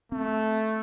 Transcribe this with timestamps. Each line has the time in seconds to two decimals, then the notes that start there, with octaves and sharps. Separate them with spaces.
0.12 A3 C4